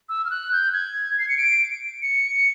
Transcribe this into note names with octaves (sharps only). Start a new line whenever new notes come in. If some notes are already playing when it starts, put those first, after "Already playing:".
E6
F6
F#6
G6
G#6
C7
C#7
D7
C#7